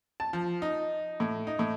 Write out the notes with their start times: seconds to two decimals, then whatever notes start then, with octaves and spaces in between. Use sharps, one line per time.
0.20 A5
0.33 F3
0.62 D#4
1.20 A2
1.47 D#4
1.59 A2